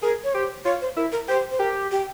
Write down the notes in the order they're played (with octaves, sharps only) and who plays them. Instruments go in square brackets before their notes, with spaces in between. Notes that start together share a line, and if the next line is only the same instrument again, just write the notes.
[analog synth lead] G#4 [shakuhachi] A#4
[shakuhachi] C#5
[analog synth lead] G4 [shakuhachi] C5
[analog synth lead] F4 [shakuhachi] C#5
[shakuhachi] C5
[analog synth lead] E4 [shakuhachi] A#4
[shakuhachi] A#4
[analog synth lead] G4 [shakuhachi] C5
[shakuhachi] C5
[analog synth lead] G4 [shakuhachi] A#4
[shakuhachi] G4